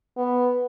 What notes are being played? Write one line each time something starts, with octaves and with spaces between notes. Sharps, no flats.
B3